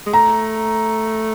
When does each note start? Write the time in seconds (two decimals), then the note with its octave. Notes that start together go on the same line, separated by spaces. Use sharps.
0.06 G#3
0.13 A3 A#5